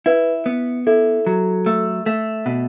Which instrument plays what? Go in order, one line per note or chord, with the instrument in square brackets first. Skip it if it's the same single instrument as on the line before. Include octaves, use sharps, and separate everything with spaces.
[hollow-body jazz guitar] E4 [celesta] B4
[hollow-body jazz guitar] B3
[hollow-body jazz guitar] E4 [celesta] A4
[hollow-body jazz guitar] F#3
A3
A3
B2